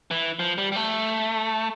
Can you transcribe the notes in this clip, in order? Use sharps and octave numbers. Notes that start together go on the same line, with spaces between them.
E3
F3
G3
G3
A3